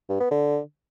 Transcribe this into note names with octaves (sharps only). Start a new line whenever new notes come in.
G2
B3
D3